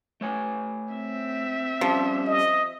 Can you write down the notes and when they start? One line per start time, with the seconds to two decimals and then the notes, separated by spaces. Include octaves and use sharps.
0.21 A3 C#5 G#5
0.94 C4 E5
1.81 F3 G3 C#4 G4
2.27 D#5